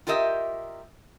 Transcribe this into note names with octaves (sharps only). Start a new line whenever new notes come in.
F4 G4 A#4 D#5 E5